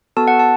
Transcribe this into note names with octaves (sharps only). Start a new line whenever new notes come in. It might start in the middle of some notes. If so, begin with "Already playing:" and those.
B3 F#4 A4 A5
F#5
A5